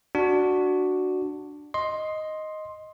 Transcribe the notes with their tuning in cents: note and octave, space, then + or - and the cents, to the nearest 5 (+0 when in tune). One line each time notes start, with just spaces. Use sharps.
D4 +5 F#4 +0
D#5 +0 C6 +10